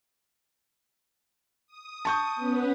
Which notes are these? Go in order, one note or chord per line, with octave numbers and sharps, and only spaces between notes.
D#6
A5 C#6 G6
B3 C#4 B4